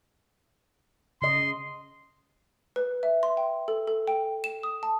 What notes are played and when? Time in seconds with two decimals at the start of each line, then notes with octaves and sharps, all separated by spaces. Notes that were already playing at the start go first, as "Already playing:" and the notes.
1.22 C#3 D#5 C6
2.76 B4
3.03 E5
3.23 C6
3.37 G5
3.68 A4
3.87 A4
4.07 G5
4.44 E7
4.63 D#6
4.83 A5